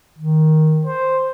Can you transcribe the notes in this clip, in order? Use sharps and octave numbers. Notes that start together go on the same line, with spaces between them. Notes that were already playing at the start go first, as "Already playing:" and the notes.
D#3
C5